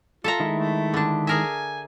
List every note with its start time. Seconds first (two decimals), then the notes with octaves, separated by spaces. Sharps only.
0.24 F4 A4 E5 A#5
0.40 D#3 G#3 E4
0.55 A3
0.94 D3 D4
1.27 G#4 A#4 E5 G#5